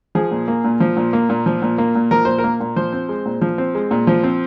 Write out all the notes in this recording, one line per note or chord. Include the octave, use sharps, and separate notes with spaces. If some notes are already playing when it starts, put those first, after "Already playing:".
F3 G#4
A#2
A#3
A#2
F3
A#2
A#3
A#2
F3
A#2
A#3
A#2
F3 A#4
A#2 C5
A#4
A#3
A#2
F3 C5
C4
G#3
A#2
F3
C4
G#3
A#2
F3
C4